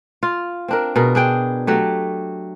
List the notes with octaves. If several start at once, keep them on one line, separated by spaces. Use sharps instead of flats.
F4
C4 D4 A#4
B2 G#4 A#4
D4 G#4 G5
F#3 A3 G4